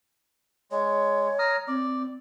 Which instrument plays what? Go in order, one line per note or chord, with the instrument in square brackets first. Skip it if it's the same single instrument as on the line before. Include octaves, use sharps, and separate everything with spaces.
[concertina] G#3 [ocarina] C#5
[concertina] A#5 D#6 F6
[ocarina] C4 [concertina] D5